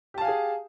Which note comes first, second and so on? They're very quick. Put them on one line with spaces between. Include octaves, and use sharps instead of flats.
G4 A5 F5 G#5 G#4